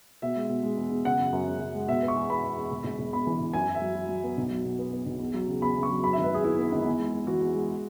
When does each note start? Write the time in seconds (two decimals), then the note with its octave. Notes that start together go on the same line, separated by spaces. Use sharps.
0.22 B2 E5
0.36 G#3
0.50 B2
0.63 G#3
0.77 E2
0.91 E2
1.05 C#3 F#5
1.18 F#2
1.33 F#2
1.47 C#3
1.60 F#2
1.75 G#3
1.88 B2 E5
2.02 B3
2.08 C#6
2.16 E2
2.30 B3 B5
2.44 E2
2.57 E2
2.72 E1
2.84 E1
2.99 E1
3.12 E2 B5
3.27 E3
3.40 E1
3.53 F#2 G#5
3.68 F#2
3.75 E5
3.82 F#3
3.95 F#3
4.09 F#3
4.24 B3
4.38 B1
4.50 F#3
4.65 B2
4.79 B3
4.93 B3
5.06 B1
5.19 E2
5.34 F#3
5.48 C#3
5.61 E2 B5
5.76 C#3
5.83 C#6
5.90 F#3
6.03 F#2 B5
6.13 G#1 E5
6.24 B4
6.30 G#1 G#4
6.44 B3 E4
6.59 B3
6.72 G#1
6.85 E2
6.99 G#3
7.13 G#3
7.27 E3 F#4
7.41 E2
7.55 G#3